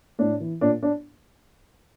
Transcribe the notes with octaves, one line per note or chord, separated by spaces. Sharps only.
A2 D4
E3
A#2 D4
D4